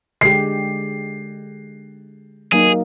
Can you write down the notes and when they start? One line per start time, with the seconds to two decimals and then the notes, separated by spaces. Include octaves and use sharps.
0.21 D3 G#3 G4 C7
2.52 F#3 A#3 D#4 G#4